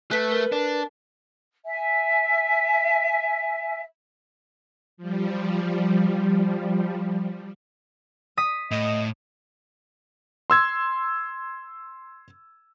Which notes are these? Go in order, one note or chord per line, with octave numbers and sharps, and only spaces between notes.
A3 B4 F#6 B6
A#4
D4
E5 G#5
F3 G3
D#6 B6
A2 D#5
C6 E6 G#6